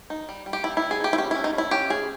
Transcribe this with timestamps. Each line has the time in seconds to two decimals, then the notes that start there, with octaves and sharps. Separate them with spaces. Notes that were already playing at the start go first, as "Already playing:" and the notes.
0.10 D#4
0.29 G3
0.46 G3
0.53 G4
0.64 G3 E4
0.77 E4
0.82 G3
0.91 G#4
1.00 D#4 G4
1.13 E4
1.18 C#4 G4
1.31 C#4 E4
1.44 D#4
1.53 C#4 E4
1.71 C#4 G4
1.90 C#4 G#4